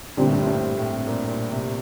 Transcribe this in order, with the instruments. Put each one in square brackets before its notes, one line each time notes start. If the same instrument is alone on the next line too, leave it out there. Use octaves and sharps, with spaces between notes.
[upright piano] A#2 [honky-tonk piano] D3 G3 C4
[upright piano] A2
G2
A2
G2
A2
A#2
A#2
C3